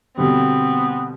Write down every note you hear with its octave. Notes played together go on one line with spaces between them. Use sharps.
B2 D3 G3 B3 C4